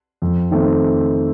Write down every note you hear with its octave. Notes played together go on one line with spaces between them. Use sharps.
F2
D#3 A3 C4